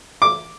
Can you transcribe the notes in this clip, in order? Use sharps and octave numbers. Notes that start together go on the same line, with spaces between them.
D6